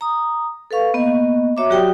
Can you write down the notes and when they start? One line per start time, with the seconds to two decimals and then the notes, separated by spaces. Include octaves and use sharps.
0.01 A#5 D#6
0.71 A4 B4 F5 C#6
0.94 A#3 B3 D#5
1.57 F#4 C#5 E5 A#5 D6
1.70 F#3 F#4 G4 D5 G5 D#6